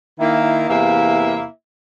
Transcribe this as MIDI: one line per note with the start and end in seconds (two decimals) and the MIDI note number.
0.20 0.69 51
0.20 0.69 58
0.20 0.69 64
0.69 1.44 40
0.69 1.44 48
0.69 1.44 58
0.69 1.44 64
0.69 1.44 76
0.69 1.44 77